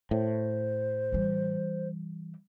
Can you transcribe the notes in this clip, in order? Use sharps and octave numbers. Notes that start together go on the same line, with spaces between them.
A2 C5
E3 G3